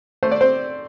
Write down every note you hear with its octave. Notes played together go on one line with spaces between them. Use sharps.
A3 C5
D5
C4 C5